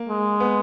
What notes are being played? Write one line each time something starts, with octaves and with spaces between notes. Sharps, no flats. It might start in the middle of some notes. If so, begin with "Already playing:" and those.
Already playing: A#3
G#3
B3